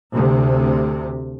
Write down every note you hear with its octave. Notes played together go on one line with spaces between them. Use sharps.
D2 C3